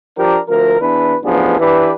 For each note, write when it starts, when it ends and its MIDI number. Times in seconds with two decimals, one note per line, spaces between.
0.18 0.38 53
0.18 0.38 62
0.18 0.38 67
0.18 0.38 70
0.49 0.77 38
0.49 0.77 53
0.49 0.77 70
0.80 1.15 40
0.80 1.15 52
0.80 1.15 62
0.80 1.15 71
1.24 1.57 33
1.24 1.57 53
1.24 1.57 59
1.24 1.57 62
1.24 1.57 68
1.59 1.92 52
1.59 1.92 62
1.59 1.92 67
1.59 1.92 71